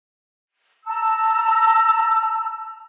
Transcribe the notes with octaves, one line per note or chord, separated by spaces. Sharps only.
A5 A#5 E6